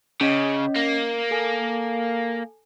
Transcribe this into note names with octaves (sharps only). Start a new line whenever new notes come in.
C#3 C#4 D#5
A#3
A4 G#5